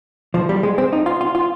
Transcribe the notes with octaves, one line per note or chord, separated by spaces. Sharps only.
F3
G3
G#3
C4
D#4
F4
F4
F4